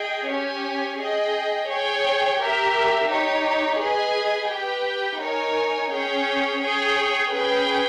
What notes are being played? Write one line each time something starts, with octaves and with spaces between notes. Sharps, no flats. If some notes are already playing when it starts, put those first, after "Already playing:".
Already playing: G#4 D#5 G5
C#4 G4 C#5 G#5
G#4 D#5 G5
G#4 C#5 G5
G4 A#4 E5
D#4 G4 C#5
G#4 B4 D#5 G#5
G4 B4 G5
D#4 A#4 C#5 G#5
C#4 G#4 C#5 G5
G#4 C#5 G5
C#4 G#4 B4 G5